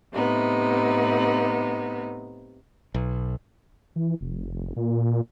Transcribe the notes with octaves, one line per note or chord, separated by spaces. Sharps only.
A2 C3 B3 D#4
B1
E3
F1
A#2